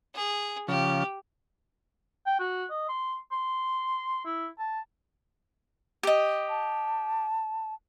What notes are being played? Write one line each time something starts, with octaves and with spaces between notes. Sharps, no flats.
G#4
C#3 F3 G4
G5
F#4
D#5
C6
C6
E4
A5
G4 D#5
A5